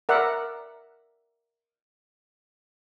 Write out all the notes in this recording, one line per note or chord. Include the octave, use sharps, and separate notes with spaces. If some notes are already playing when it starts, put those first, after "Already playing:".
A#4 D5 E5 F#5